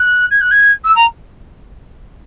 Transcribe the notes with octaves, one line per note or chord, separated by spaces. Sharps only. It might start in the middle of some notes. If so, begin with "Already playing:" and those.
Already playing: F#6
G#6
F#6
G#6
E6
A#5